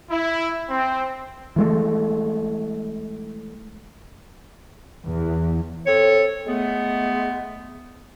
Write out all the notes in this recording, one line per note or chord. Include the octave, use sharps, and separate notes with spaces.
E4
C4
E3 G#3 A3
E2
C4 A4 C#5
G#3 A3 B3